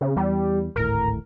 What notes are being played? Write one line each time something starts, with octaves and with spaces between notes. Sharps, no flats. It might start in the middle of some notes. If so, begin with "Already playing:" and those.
C#3
E2 G3
D1 G#1 A2 A#4